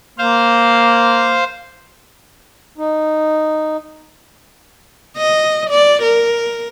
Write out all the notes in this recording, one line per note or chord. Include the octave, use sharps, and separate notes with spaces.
A#3 C5 F5
D#4
D#5
D5
A#4